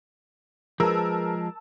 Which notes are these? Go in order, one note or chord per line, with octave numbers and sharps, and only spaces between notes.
F3 G#3 G#4 A#4 B4 A5 E6